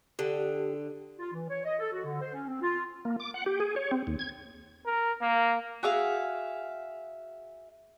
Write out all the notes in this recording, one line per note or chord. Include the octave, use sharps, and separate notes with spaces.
D3 G4 A4
F4
E3
C#5
D#5
A4
F#4
D3
C5
C#4
C4
F4
A#3
D6
F#5
G4
G#4
C#5
C4
D#2
G#6
A#4
A#3
F#4 G#4 E5 F5